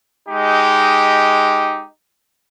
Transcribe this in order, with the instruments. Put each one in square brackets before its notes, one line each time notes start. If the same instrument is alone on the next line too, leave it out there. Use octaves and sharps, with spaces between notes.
[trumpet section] G#3 D#4 G4